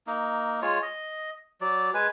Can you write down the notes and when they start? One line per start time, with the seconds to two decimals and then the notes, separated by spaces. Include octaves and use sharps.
0.07 A#3 D#4
0.62 G#3 F4 C#5
0.82 D#5
1.61 F#3 D5
1.94 G#3 B4 G#5